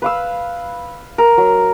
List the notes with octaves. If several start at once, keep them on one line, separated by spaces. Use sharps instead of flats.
B4 F5 E6
A#4
F#3